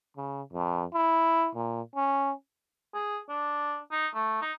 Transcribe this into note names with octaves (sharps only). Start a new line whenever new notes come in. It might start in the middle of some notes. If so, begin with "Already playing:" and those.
C#3
F2
E4
A#2
C#4
G#4
D4
D#4
A3
D#4